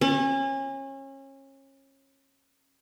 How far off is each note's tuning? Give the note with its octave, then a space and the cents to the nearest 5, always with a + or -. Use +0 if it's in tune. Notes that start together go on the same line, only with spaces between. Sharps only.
C#4 -30